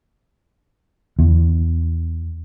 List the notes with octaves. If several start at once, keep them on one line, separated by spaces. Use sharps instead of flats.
E2